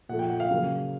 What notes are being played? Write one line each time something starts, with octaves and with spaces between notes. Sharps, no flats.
A#2 F3 A3 F#5
G5
F#5
F5
C#3 F#3 A#3